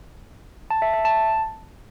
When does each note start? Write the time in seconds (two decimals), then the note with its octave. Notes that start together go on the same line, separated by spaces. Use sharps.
0.70 A5
0.82 E5
0.94 E5
1.05 A5